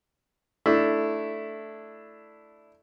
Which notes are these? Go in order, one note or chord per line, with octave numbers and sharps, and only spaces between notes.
A3 D4 E4